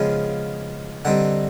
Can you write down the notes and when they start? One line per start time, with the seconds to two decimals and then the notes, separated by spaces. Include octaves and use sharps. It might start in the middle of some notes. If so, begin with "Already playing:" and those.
Already playing: C#3 F3 G#3 B3 F5
1.05 D3 G3 C4 D#4 F#5